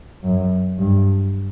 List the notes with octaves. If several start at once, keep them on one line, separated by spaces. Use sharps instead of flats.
F#2
G2